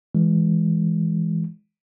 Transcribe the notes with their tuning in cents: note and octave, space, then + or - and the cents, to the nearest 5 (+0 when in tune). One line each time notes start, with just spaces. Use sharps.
E3 +0 G#3 +0